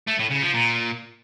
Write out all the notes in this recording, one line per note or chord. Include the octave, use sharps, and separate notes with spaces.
A3
A2
C#3
F3
A#2